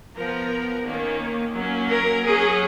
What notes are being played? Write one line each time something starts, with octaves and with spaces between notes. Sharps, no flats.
F3 B3 A#4
D#3 A#3 C#4
F#3 A#3 C#4
A#4
F#3 C#4 G#4